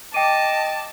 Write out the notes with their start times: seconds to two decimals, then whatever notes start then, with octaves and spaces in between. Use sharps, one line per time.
0.14 D#5 G5 A5 D6 D#7